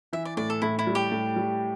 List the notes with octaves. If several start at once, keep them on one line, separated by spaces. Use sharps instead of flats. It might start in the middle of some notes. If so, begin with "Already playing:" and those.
E3 E5
D5
A2 D5
A4
A2 E4
E4
G3
G4
A2
G3